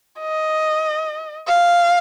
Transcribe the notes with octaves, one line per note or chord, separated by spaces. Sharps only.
D#5
F5